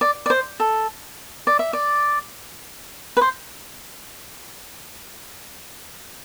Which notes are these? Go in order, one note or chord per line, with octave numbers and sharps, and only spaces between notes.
D5
D5
C5
A4
D5
E5
D5
B4
C5